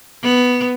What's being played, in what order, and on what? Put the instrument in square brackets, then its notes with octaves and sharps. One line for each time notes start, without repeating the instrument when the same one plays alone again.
[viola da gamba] B3